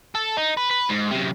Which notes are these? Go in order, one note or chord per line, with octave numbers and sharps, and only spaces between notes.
A4
D#4
B4
B4
G#2
F#2 C3